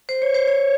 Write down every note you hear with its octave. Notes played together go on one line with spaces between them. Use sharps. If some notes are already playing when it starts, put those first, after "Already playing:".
C5
C#5
C5
C#5